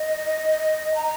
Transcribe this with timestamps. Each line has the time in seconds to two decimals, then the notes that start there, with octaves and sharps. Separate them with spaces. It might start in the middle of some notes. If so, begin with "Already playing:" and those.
Already playing: D#5
0.95 A#5